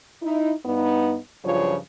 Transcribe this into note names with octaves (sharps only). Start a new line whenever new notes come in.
D#4 E4
G2 B3 D#4
G2 C#3 F3 F#3 F4 C#5